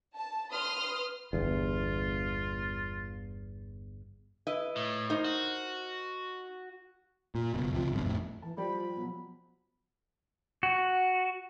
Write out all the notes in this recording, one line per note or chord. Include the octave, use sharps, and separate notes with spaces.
A5
B4 C6 D#6 F6
G1 E2 F4
E4 B4 D#5
A2
D#4 A#4 C5
F#4
A#2
F#1 B2
C#2 C3 F3
G#1 G2 B2
F2 A2
E3 A5
F3 G3 G4 D5 B5
B2 F#3
F#4